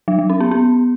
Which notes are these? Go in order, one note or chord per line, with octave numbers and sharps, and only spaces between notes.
F#3
F#3
C#4
B3
B3